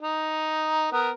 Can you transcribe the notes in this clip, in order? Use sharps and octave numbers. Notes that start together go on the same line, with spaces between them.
D#4
B3 A#4